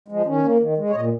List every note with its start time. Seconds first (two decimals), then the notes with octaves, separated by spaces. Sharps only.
0.08 F3 G#3
0.25 D#3 C#4
0.44 A#3
0.60 D#3
0.78 G#3
0.90 C#5
0.95 A#2 D#5